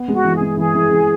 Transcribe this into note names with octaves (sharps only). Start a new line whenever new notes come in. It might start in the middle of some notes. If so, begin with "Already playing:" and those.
Already playing: B3
G#3 F#4
E3
G#4
G#3
E3 G#4
E3
E3